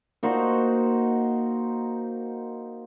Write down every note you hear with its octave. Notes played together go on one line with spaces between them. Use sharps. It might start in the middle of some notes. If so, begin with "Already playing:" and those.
A#3 D#4 F#4 C5